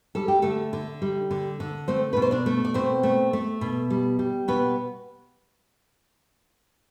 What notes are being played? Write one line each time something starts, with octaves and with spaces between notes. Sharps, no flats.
G3 A4
G4
D3 A3 A4
D3
G3
D3
D3
A3 C4 C5
B2 B4
C5
D4 D5
A3
D5
B2 C4 C5
A3
A3
B2
G3
G3
B2 B3 B4